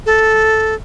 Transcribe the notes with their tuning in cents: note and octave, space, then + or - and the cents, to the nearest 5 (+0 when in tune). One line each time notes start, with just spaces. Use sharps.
A4 -5